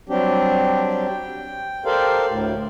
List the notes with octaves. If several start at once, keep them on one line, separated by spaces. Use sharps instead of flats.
F#3 G3 C4 D4 G4
G5
G4 A4 A#4 C5 D5 F5
D2 A2